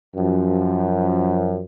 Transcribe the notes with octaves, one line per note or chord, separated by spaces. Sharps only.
F#2 F3